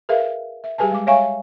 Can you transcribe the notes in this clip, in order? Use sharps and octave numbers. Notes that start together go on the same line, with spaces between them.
G#4 A#4 B4 E5 F5
E5
G3 G4 G#4 B4 G#5 A5
G#3 D6
C#5 E5 F5 G#5 C#6